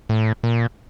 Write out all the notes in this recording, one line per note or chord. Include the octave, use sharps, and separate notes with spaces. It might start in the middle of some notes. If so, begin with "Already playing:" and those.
A2
A#2